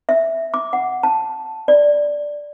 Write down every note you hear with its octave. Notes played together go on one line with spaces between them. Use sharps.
E5
D6
F#5
A5
D5